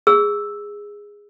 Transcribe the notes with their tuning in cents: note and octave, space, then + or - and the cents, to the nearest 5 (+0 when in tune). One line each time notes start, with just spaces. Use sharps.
G#4 -10 E6 +0